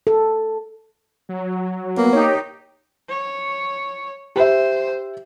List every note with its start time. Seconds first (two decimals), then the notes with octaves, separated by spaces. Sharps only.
0.07 A4
1.29 F#3
1.97 A#3 B3
2.13 D#4 G4 C#5
3.10 C#5
4.36 G4 C5 E5